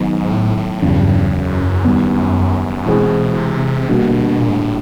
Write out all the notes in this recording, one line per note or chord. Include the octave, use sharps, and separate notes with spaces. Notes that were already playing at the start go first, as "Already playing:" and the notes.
Already playing: G#2 D#3 F#3 B3
A2
A2
E2 G2 C#3 F#3
F#2
D#3 G3 B3
B2 E3 G#3 C4 E4 G#4
C3
B2 D3 G3 A#3 D4 F#4
A#2
G#2
A2